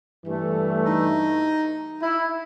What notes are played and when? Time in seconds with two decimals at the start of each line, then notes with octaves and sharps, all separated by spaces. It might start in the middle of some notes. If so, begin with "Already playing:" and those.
0.25 G2 E3 A3
0.84 D#4
2.01 E4